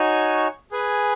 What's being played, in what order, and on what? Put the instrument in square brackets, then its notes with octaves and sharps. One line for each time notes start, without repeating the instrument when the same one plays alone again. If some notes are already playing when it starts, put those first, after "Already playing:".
Already playing: [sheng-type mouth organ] D#4 F#4 C#5 G#5
G#4 B4 G#5